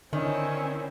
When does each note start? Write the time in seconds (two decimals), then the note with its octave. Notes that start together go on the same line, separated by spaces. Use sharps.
0.13 D3 D#3 C4 C#4 E4 C#5 D5